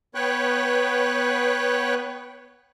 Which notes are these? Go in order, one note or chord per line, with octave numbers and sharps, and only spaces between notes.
B3 B4 C#5 G5 F#6